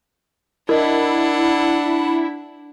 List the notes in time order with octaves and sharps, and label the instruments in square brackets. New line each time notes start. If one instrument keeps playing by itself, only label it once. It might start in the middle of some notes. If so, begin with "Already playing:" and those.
[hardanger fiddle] D4 F#5 [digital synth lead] E4 [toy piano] A#4 D#5